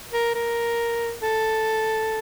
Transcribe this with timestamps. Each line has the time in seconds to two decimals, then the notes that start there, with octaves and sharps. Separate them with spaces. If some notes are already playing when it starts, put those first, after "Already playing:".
0.13 A#4
0.35 A#4
1.22 A4